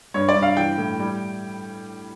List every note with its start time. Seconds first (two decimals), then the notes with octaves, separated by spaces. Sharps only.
0.14 G2 C#5
0.29 D5
0.35 G2
0.42 F5
0.57 E3 G5
0.78 A2
1.00 G3